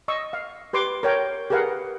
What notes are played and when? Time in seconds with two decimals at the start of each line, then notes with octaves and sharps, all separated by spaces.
0.08 D#5 C#6 E6
0.33 F5
0.73 G4 B4 C6 D6
1.03 A#4 C#5 G5
1.50 G4 G#4 A#4 B4 F5 F#5